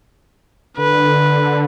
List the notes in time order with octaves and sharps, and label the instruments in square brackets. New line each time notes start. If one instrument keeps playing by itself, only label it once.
[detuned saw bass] D3 [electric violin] B4